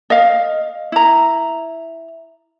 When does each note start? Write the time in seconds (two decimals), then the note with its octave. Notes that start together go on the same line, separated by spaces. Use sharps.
0.10 D#5 F5
0.92 E4 A#5